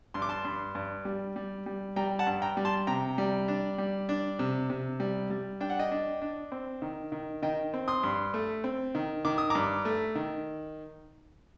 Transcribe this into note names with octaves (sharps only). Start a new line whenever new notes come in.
G2 C6
D6
A5 C6
G2
G2
G3
G3
G3
G3 G5 A#5
F#5 A5
G2
G5 A#5
G3
A5 C6
C3 G5 A#5
G3
D4
G3
D4
C3
C3
G3
G3
D4 G5
F#5
D#5 G5
D4
D4
C4
D#3
D#3
D#3 D#5 G5
C4
C6 D#6
G2
A3
C4
D#3
D#3 D6
D#6
G2 A#5 D6
A3
D#3